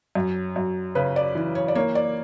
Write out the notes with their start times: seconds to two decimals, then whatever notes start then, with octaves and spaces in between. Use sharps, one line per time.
0.15 F#2
0.56 F#2
0.95 C#3 B4
1.16 D5
1.35 E3
1.55 C#5
1.68 D5
1.75 A#3 C#5
1.95 D5